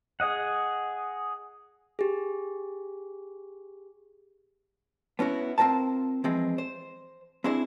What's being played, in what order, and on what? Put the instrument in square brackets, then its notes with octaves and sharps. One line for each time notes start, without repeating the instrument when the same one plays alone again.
[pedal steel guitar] G#4 D#5 F#5
[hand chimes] G4 G#4
[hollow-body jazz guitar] B3 C#4 E4 F#4
C4 F4 A#4 C5 A5
E3 F3 G#3 C4
C5
C4 D4 E4 G#4 C5